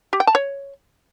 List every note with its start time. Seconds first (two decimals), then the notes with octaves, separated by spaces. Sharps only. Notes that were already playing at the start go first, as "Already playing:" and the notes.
0.13 G4
0.20 G5
0.27 A5
0.35 C#5